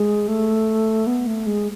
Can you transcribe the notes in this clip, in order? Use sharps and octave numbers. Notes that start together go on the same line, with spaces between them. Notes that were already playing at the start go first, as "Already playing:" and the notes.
Already playing: G#3
A3
B3
A3
G#3